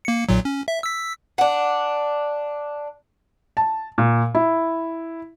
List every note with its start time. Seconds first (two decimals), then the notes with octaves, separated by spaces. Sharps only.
0.05 A#3 C#7
0.29 B1 A#2 F#3
0.45 C#4
0.68 E5
0.83 E6 B6
1.38 D4 F#5
3.57 A5
3.98 A#2
4.35 E4